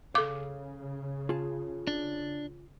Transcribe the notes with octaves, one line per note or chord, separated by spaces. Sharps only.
C#3 A4 F5 D6
F4 G#4 A5
D4